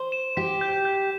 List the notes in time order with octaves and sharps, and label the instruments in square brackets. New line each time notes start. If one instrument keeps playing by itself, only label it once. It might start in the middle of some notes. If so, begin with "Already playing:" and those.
Already playing: [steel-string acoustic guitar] C5
[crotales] E7
[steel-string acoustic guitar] G4 [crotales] B6
[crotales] G6
G6